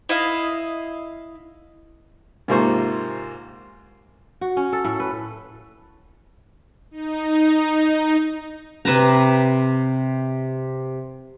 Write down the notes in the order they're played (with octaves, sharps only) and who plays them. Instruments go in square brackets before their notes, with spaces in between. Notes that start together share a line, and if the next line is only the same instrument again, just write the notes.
[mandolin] E4 D#5 F5
[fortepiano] G#2 C3 A#3 F4 C5 C#6
[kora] F#4
C#4
A4
A2
B4
[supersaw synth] D#4
[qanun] C3 B4 A5 A#5